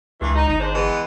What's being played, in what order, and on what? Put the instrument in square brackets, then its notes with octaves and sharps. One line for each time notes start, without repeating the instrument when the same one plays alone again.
[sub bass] C#2 [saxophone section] G2 E3
[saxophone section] D#4
[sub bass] G1 [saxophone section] D#4
[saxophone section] G#2 D4 C5
E3 G#3 B3